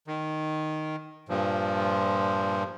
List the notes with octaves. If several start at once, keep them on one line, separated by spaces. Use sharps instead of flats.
D#3
G2 A#2 F3